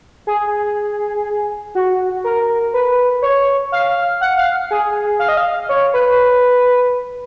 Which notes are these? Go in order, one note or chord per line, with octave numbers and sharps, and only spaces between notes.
G#4
F#4
A#4
B4
C#5
F5
F#5
F5
G#4
F5
D#5
F5
C#5
B4